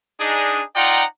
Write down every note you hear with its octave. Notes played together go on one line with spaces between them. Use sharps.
D4 D#4 G#4
D#4 F4 D5 F#5 G5 A#5